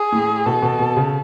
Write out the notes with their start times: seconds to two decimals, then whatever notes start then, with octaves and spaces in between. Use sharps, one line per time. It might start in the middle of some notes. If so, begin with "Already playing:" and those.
Already playing: G#4
0.12 A2
0.46 B2 A4
0.62 B2
0.79 B2
0.97 C#3